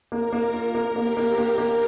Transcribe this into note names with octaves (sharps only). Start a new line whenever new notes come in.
A#3 A#4
A#3
F4
A#3
A#3 G4
A#3
A#3
A#3